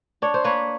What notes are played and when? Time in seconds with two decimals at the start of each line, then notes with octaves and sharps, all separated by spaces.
0.22 D4 C#5
0.34 C5
0.44 A#3 B4 C#5